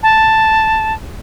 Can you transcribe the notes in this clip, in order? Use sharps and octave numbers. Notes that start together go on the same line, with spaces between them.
A5